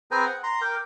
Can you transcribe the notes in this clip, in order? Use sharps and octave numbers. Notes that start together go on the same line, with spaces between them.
C4 G#4 B4 G5 G#5 A#5
F#5
A#5 C6
A#4 G5 D6